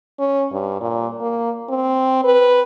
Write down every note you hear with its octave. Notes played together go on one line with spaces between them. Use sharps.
C#4
G2
A#2
A#3
C4
B4